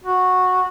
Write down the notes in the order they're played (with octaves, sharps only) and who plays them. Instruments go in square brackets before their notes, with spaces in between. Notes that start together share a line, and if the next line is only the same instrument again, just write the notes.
[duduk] F#4